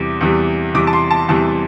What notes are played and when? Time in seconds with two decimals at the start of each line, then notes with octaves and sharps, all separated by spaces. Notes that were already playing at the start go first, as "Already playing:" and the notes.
Already playing: E2 C3 E3 G3 D6
0.21 E2 C3 E3 G3
0.74 E2 C3 E3 G3 D6
0.87 A5
0.93 C6
1.11 A5
1.28 E2 C3 E3 G3 A5